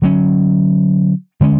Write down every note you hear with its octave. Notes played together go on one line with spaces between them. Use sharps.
D3 F#3 C#4
D3 G#3 C#4